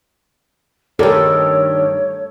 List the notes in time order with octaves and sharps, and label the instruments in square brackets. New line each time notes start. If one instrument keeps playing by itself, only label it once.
[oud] G2 D#3 [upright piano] G4 A#4 D5 [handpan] A4 [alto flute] C#5